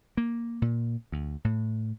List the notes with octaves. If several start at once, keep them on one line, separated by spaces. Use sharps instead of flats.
A#3
A#2
D2
A2